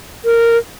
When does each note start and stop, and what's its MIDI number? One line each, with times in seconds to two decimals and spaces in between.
0.25 0.57 70